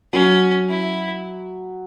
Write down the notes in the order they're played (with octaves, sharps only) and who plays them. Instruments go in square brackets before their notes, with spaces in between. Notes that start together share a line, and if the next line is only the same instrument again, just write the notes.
[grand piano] F#3 [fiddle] C#4
[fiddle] E4